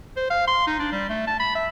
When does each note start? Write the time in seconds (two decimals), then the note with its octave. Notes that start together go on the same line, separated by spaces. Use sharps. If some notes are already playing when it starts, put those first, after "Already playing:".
0.17 C5
0.30 F5
0.47 C6
0.67 D#4
0.79 D4
0.92 G3
1.10 A3
1.27 A5
1.39 B5
1.55 E5